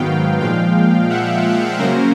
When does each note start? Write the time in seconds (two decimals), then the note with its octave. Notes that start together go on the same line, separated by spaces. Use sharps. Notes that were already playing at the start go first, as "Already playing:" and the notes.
Already playing: G#2 D#3 F#3 B3 F5 G5
0.40 A#2 F3 G#3 F5 G5
1.10 E5 F#5
1.79 C#3 F#3 A#3 C#4 A#4 C5